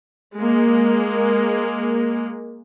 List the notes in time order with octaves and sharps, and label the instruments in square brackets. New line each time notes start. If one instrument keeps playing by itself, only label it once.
[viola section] G#3 A#3